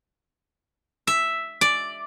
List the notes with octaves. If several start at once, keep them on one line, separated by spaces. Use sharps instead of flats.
E5
D5